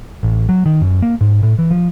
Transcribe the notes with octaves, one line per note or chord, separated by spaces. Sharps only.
A1
F#3
D#3
F#2
A#3
G#2
A2
E3
F3